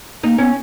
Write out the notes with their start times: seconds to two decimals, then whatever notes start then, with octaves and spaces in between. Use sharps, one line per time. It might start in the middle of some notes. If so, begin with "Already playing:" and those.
0.23 A#3 D#4
0.38 B3 C#4